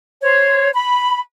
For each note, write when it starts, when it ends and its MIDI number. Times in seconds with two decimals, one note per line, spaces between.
0.22 0.69 72
0.22 0.69 73
0.73 1.18 83